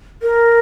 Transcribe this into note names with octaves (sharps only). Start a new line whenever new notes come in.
A#4